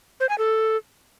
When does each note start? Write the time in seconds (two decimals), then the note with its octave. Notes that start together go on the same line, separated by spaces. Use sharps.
0.20 C5
0.29 G#5
0.38 A4